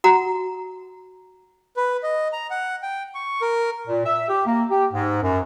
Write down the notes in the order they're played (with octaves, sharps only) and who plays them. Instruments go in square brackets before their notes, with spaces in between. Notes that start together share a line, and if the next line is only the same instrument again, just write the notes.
[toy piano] F#4 F#5 A#5
[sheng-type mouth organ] B4
D#5
A#5
F#5
G5
C#6
A#4
[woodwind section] A#2
E5
G4
A#3
G4
G#2
F#2